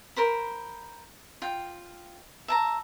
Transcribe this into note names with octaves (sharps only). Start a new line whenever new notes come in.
A#4 C5 B5
F4 G5
E5 A5 A#5